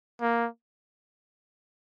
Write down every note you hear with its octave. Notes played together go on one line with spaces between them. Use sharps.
A#3